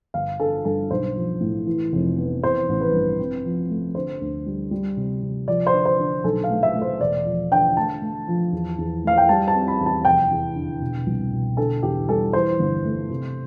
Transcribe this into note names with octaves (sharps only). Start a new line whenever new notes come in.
G1 F5
D3 A4
G2 A4
B1 C5
F3
A2
E3
F1
B3
E3 C5
A1
B4
G2
C4
F3
A3
D3 C5
D2
G3
G3
C3
C3
F3 D5
C5
D3
C5
D3
B1 A4
F5
A3
E5
A3
C5
E1 D5
F3
D3 G5
A3 A5
A3
F3
E2
E2
A3 F5
G5
G3 A5
A5
C4
B5
E2
A5
F1 G5
E2
D3
B2
C2
B2
D3 A4
E2 G4
G3 A4
E3 C5
G1
A3
C3